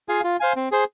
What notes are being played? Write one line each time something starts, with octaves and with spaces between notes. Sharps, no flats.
F4 G#4 F5 G#5
F4
C5 F5 G#5
C4
G#4 C5